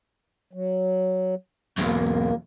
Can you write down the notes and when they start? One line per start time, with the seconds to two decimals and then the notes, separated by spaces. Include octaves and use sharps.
0.53 F#3
1.78 B1 E2 A#3